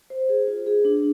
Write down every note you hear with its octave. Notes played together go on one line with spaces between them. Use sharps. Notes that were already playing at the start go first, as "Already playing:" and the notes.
C5
G#4
F4
G#4
D4